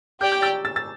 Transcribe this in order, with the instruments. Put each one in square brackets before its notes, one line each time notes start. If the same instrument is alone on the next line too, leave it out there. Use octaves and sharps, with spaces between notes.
[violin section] G4 D5 G5 [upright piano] D6 G6
[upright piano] D6 G6
E6 A6
E6 A6
E6 A6